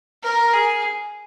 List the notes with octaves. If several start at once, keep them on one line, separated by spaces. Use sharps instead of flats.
A#4
G#4